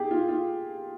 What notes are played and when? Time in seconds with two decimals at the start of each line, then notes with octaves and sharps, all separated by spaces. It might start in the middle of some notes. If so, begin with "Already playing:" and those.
Already playing: G4 G#4
0.11 F4
0.28 F4